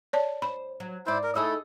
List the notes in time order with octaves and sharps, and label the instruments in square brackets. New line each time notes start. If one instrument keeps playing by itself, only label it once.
[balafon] C#5 D5 A5
[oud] C5 [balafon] B5
[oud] F#3
[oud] G#2 D5 [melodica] E4 C5
[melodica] A#4
[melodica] A3 E4 [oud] D#4 G#4 A4